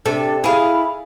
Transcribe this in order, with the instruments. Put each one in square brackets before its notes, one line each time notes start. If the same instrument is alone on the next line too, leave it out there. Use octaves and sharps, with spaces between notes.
[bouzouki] C3 [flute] D4 [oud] A4
[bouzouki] E4 F5 [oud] G#4 [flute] B5